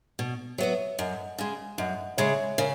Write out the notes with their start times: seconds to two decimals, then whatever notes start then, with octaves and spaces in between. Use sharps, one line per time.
0.19 B2
0.58 F#3 B3 F#4 C#5 E5
0.98 F#2 D#5 F#5
1.38 C#3 G#3
1.78 F#2 D#5 F#5
2.17 C#3 G#3 C#5 E5
2.58 C#3 A#4 C#5